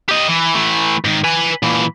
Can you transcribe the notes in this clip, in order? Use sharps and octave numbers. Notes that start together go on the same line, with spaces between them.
G4 D#5
E3
E3 A3
G#2 D#3
B4 G#5
A#2 E3